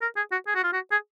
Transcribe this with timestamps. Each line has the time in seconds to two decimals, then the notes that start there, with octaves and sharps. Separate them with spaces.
0.02 A#4
0.17 G#4
0.32 F#4
0.47 G#4
0.55 F#4
0.64 F4
0.73 F#4
0.92 G#4